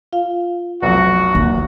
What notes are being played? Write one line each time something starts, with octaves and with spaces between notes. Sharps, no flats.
F4 F5
F1 B1 F#4
D#2